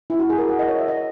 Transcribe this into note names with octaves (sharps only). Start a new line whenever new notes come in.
E4
F#4
G#4
A#4
F#5
D#5
C#5
E5
D#5